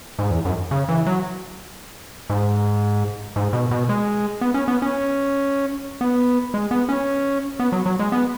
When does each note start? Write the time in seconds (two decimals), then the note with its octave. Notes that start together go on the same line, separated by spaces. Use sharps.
0.19 G#2
0.31 E2
0.45 F#2
0.71 C#3
0.89 E3
1.06 F#3
2.30 G#2
3.36 G#2
3.53 B2
3.71 B2
3.89 G#3
4.41 B3
4.54 C#4
4.68 B3
4.82 C#4
6.01 B3
6.54 G#3
6.71 B3
6.89 C#4
7.59 B3
7.72 F#3
7.86 F#3
7.99 G#3
8.12 B3